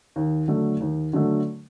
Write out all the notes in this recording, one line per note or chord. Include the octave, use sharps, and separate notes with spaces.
D#2
D3 F#3 A3
D#2
D3 F#3 A3